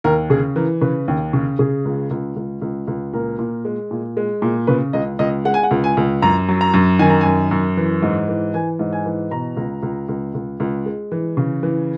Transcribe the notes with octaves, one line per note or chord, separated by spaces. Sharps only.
D#2 A#4
C#3 G#4
E3 A#4
C#3 B4
D#2
C#3
C#3 G#4
C#2
C#2
C#2
C#2
C#2
A#2 A#4
A#2
G#3
A#2
G#3
A#2
C#3 B4
C#2 D#5
C#2 D#5
G#3 F#5
G#5
F#5
C#2
G#5
C#2
F#2 A#5
F#3
A#5
F#2
D#3 G#5
A#5
F#2 G#5
F#2
E3
G#2
E3
E3 G#5
G#2
G#5
E3
B2 A#5
C#2
C#2
C#2
C#2
C#2
G#3
E3
C#3
E3